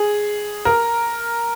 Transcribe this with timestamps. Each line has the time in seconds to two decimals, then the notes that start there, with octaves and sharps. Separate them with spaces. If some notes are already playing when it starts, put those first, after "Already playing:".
Already playing: G#4
0.65 A#4